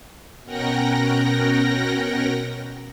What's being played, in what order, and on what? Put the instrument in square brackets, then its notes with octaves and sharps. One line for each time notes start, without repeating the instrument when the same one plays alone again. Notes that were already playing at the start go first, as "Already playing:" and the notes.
[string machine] B2 C#4 A#4 F#5 G5 A#6